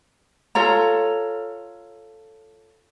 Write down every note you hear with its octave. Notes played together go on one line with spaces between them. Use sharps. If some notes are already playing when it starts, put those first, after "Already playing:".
F4 A4 C#5 A#5